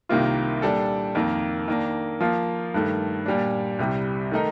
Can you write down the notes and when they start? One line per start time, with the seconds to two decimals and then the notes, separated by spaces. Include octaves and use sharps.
0.09 C2 C3 D#3 A#3 F4
0.62 A#2 G3 D4 A4
1.15 F2 D#3 A#3
1.68 D#3 A#3 D4
2.20 F3 A#3 F4
2.74 G2 D#3 A3
3.26 A#2 G3 D4
3.79 C2 C3 G3
4.31 D#3 A3 D#4 A#4